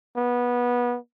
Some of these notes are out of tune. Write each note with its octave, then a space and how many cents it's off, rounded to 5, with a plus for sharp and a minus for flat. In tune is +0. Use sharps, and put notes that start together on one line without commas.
B3 -20